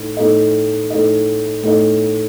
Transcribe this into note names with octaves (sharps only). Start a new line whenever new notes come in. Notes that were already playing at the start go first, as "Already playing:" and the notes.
Already playing: A2 A3 D#4
A2 A3 D#4 A4 D#5
A2 A3 D#4 A4 D#5
A2 A3 D#4 A4 D#5